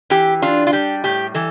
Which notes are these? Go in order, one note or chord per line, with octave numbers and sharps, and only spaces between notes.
E3 G4
D4 F4
F4
G3 G4
A2 G4
E3 A4